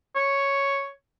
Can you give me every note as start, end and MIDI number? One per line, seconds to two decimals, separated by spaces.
0.15 0.90 73